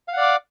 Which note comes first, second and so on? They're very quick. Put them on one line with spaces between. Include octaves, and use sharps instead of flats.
F5 F#5 D5 D6